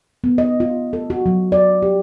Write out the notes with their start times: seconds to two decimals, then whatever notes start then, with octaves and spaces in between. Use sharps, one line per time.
0.24 B3
0.38 D#5
0.60 F4
0.93 A4
1.10 F#4
1.26 F#3
1.52 D5
1.82 G4